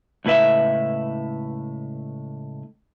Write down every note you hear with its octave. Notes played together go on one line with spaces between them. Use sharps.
C#2 A2 E4 B4 E5